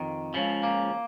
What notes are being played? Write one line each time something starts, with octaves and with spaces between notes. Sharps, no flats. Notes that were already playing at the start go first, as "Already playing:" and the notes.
Already playing: F2 D#3
C#2 C#3 F3
A#3